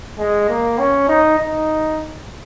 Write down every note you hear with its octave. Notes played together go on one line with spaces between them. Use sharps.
G#3
A#3
C#4
D#4
D#4